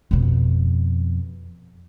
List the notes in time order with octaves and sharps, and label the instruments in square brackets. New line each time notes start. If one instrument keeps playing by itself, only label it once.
[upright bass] F2 B2